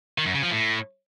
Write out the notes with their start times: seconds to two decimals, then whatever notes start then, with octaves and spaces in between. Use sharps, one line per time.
0.18 D#3
0.26 F#2
0.34 C#3
0.43 F3
0.51 A2